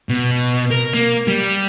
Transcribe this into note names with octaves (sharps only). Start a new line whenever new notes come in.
B2
A#4
A#3
G3